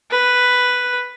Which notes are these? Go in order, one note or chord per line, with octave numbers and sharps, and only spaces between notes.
B4